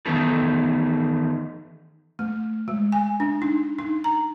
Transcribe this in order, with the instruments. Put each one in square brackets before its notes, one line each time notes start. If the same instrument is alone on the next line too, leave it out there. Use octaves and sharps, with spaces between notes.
[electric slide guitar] D#3 E3 A3 B3 D#4 A4
[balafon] A3
G#3
G#5
D4
D#4
D#4
A#5